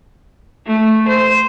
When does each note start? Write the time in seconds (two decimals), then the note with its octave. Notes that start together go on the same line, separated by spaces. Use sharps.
0.67 A3
1.09 C5